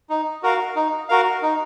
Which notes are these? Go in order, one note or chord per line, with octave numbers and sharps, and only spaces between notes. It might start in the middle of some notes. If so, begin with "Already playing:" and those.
D#4
F#4 A#4 F5
D#4
F#4 A#4 F5
D#4